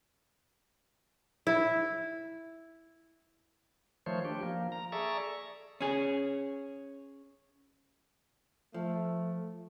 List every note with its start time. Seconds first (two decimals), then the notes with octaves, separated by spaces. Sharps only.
1.47 E4
4.06 D#3 F3 A3 C5 C#5
4.25 D4 G4
4.43 F3 A#3
4.72 A#5
4.92 G#4 A4 D5 E5 A#5 C#6
5.81 C#4 G#4
8.74 F3 A3